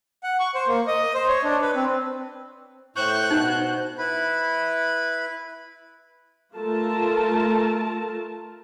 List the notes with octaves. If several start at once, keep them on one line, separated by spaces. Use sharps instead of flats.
F#5
C#6
C5
A#3
D#5
C5
C#5
D4
B4
C4
A2 C5 C#6 F#6 G6
B2 D#4
E4 B4 B5
A3 F4 A#4 A5